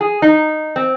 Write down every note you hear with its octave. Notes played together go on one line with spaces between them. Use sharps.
G#4
D#4
C4